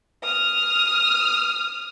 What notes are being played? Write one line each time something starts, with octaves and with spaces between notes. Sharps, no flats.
D#6 F6